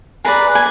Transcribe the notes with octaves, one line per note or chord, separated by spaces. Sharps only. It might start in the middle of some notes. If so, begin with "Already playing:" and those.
G#4 B4 D5 A#5
G#5